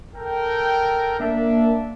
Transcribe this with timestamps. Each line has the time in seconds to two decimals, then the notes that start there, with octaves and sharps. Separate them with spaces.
0.15 A4 A#4 G5
1.20 A#3 D4 E5